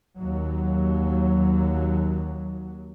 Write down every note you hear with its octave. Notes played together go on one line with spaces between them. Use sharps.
D#2 F#3